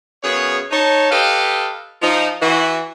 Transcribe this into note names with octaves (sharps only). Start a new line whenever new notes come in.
F#2 C#3 B3 G#4 C#5
D#4 C#5 A5
G4 A4 B4 D#5 F5 G5
F3 D#4
E3 F#4